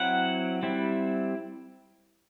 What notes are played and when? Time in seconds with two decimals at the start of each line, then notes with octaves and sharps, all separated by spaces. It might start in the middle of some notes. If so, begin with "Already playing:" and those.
Already playing: F#3 C4 E4 F#5
0.63 G3 C4 E4